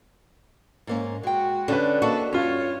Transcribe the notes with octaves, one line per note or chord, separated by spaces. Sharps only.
G#2 A#3 C#4
G#3 F#4 G5
D3 C#4 D4 B4
A#3 F#4 A4 D#5
G2 C#4 F4 C#5